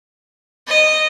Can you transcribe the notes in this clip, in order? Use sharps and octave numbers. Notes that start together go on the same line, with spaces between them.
D#5